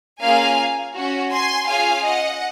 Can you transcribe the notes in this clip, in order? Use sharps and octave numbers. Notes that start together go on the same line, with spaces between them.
A#3 C#4 F4 G#4 F5 G#5
C#4 F#4
G#5 C6
C#4 F4 G#4 F5 G#5
D#5 F#5